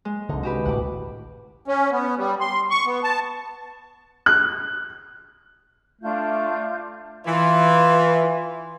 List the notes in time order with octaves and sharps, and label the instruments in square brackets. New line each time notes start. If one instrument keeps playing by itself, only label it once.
[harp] G#3
[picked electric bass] C2 D3 [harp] D#4
[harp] F#4 G4 B4
[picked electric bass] G#1 D2 A2 [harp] F#5 D6
[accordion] C#4
B3
G3
C6
C#6
B3
A5
[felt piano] F#6
[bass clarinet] A3 [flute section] D4 F4 G6
[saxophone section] E3 [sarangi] F4